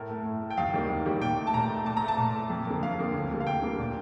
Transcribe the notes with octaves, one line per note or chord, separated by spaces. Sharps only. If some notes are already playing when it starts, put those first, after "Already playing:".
Already playing: A2 A#4
A3
A2
A3
G5
D#2 F5
D#3 G3 A#3
D#2
D#3 G3 A#3
A#2 G5
A3
A5
A#2 A#5
A3
A#2 A5
A#5
A3
A5
A#2
A3
F2
D3 F3 A#3
F2 F5
D3 F3 A#3
D2
D3 G3 A#3
F5
D2 G5
D3 G3 A#3
A#2